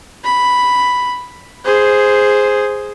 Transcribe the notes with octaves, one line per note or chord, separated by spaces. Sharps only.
B5
G#4 C5